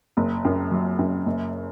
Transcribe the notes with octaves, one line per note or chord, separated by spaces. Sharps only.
F#1
F#2
F#3
F#2
F#1